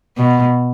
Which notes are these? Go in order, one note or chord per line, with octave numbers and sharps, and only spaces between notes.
B2